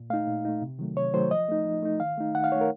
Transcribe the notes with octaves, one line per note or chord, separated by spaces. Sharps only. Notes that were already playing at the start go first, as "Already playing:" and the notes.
Already playing: A#2
A3 D#4 F5
A#2
A3 D#4
C3
D#3 F#3 A3
C3 C#5
D#3 F#3 A3 C5
F3 D#5
A3 D#4
F3
A3 D#4
D#3 F5
A3 D#4
D#3 F#5
F5
A3 D#4 C#5
A#4